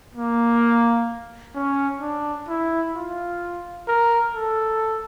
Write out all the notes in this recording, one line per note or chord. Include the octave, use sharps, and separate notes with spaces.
A#3
C#4
D4
E4
F4
A#4
A4